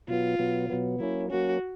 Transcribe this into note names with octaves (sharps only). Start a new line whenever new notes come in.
B2 F#3 B3 F4
B2 F#3 B3
B2 F#3 B3
F#3 A#3 C#4 E4
F#3 A#3 C#4 F#4